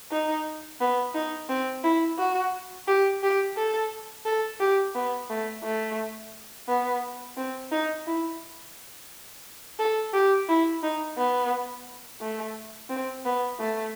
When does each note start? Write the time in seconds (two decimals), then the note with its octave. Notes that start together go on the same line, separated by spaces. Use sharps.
0.12 D#4
0.81 B3
1.14 D#4
1.49 C4
1.84 E4
2.18 F#4
2.88 G4
3.23 G4
3.57 A4
4.25 A4
4.60 G4
4.95 B3
5.30 A3
5.64 A3
6.68 B3
7.37 C4
7.72 D#4
8.07 E4
9.79 A4
10.14 G4
10.49 E4
10.83 D#4
11.18 B3
12.21 A3
12.90 C4
13.25 B3
13.60 A3